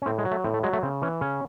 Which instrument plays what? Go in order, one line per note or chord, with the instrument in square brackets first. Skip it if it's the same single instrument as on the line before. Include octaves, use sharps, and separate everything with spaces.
[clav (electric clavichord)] C#4
A2 C4
G#3
F#3
A3
A2 C4
A3
F#3 G#3
A3
C#3 C4
E3 C#4
C#3 C#4